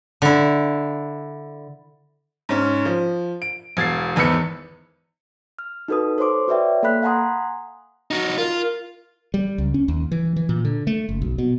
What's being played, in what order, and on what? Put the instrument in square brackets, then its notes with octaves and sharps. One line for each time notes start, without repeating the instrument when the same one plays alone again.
[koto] D3 E4
[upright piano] G#2 C#4
F3
D7
E1 G#6 A6 C7
G#1 E2 B4 E6 C#7
[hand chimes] F6
D#4 F#4 A4 B4 D#6
A4 C5 C#5 C6 D6
F#4 B4 C#5 D5 E5 G5
A#3 A4 F5 B5 F#6 B6
F5 F#5 G#5 A#5 C6 D#6
[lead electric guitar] D#4 F#4
[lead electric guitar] F4 [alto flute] A#4
[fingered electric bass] G3
C#2
C#4
D#2
E3
E3
A#2
D3
A3
F#1
B1
B2